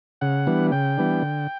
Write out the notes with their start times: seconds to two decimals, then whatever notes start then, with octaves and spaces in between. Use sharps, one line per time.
0.21 C#3 F#5
0.47 E3 G3 B3 D4
0.72 C#3 G5
0.98 E3 G3 B3 D4
1.22 D3